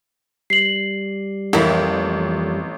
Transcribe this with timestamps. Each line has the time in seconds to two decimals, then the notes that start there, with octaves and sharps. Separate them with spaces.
0.50 G3 C7 F#7
1.53 A1 F2 A#3 E4